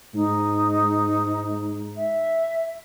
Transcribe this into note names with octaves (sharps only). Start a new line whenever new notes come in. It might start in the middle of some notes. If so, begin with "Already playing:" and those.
G#2 D#4
E5